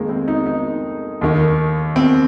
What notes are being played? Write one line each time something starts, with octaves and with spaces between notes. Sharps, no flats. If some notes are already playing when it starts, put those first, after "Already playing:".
Already playing: F2 D#3 G#3 A#3
C4
D#4
D#4
D#2 D#3
C4